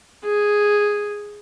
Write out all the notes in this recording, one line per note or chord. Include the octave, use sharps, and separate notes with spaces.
G#4